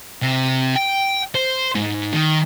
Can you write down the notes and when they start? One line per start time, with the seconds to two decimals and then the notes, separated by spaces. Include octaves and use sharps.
0.22 C3
0.76 G5
1.35 C5
1.75 G#2
2.13 D#3